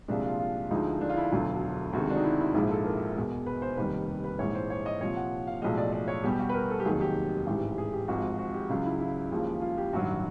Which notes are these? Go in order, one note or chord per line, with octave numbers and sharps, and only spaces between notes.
C2 A#2 F3 G#3 D4
F4
F4
D2 D3 F3 G#3 D#4
D4
F4
E4
E1 D2 D3 F#3 F4
D2 C3 D#3 G#3 F#4
D4
D#4
E4
E4
A#1 G#2 F3 G#3 E4
A4
A#4
E2 B2 G#3
B4
C5
F1 D#2 D#3 G3 B4
B4
A#1 G#2 E3 C#5
C5
C#5
D#5
C2 A#2 F3 C#5
F#5
F5
B1 A2 F3 G#3 D#5
D5
D5
C#5
E2 B2 G3 G4
F#4
B4
A#4
A4
G4
F1 D#2 D#3 F#3 G#4
G4
A1 G#2 E3
G#4
G4
G#1 G#2 F3 G#3 F#4
F#4
G4
C#2 C#3 F#3 F4
E4
E4
D#2 C#3 F3 G#3
F4
G4
A1 G2 D#3 F#3 F#4